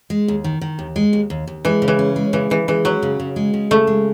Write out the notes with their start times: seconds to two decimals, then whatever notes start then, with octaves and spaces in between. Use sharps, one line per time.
0.10 G#3
0.28 D#2
0.44 D#3
0.61 D#3
0.79 D#2
0.96 G#3
1.13 D#2
1.30 D#2
1.47 D#2
1.65 E3 G#3
1.82 C#3
1.88 E3
1.99 C#4
2.16 G#3
2.33 C#3 E3
2.50 C#3 E3
2.68 E3 G#3
2.85 F#3 C#4
3.02 C#3
3.20 C#3
3.36 G#3
3.54 C#3
3.71 C#3 A3
3.87 G#3